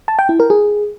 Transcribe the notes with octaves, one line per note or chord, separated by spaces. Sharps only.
A5
G5
E4
A#4
G#4